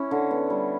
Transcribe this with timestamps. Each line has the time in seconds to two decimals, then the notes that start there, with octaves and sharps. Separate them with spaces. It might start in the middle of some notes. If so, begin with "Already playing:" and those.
Already playing: C#4 E4
0.11 D3
0.31 B3
0.50 G3